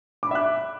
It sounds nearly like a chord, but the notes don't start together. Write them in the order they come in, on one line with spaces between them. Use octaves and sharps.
D6 B5 E5 F#6